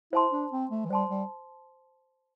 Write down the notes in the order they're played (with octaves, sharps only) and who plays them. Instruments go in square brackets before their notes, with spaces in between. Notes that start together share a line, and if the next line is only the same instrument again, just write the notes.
[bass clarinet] E4 [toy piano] C5 A5 C6
[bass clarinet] D4
C4
A3
E3
[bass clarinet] G3 [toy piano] C5 A5 C6
[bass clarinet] G3